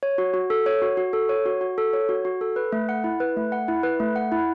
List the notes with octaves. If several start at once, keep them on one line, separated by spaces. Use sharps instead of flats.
C#5
F#4
F#4
A4
C#5
F#4
F#4
A4
C#5
F#4
F#4
A4
C#5
F#4
F#4
A4
B4
A3
F#5
E4
B4
A3
F#5
E4
B4
A3
F#5
E4